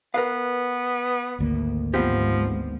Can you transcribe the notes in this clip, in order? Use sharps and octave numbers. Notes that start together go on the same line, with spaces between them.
B3 A#4 B4 F5
G#1 D2 A#3
G#2 F3 B3 C4 G4